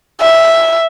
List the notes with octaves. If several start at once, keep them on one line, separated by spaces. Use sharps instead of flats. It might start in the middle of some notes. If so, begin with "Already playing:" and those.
E5